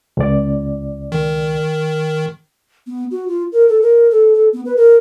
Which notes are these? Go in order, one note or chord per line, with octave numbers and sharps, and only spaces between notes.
C#2 D5
D#3
B3
F#4
F4
A#4
A4
A#4
A4
A4
B3
B4
A#4